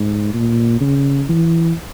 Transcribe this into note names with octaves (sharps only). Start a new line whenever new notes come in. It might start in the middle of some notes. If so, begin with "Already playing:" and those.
Already playing: G#2
A#2
C#3
E3